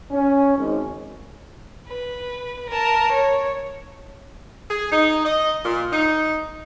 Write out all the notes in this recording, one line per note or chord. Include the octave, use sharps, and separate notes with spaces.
C#4
G#1
B4
A#4 A5
C#5
G#4
D#4
D#5
A#2
D#4